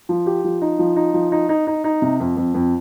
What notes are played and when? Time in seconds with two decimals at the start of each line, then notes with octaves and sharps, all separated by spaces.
0.09 F3
0.26 G4
0.44 F3
0.61 D#4
0.79 F3
0.96 D#4
1.14 F3
1.32 D#4
1.49 D#4
1.67 D#4
1.84 D#4
2.02 C3
2.20 F2
2.37 F2
2.54 F2